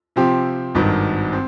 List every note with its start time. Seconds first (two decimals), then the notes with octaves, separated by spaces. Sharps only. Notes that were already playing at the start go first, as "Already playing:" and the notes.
0.16 C3 F3 C4 G4
0.75 G#1 G2 D#3
1.33 C4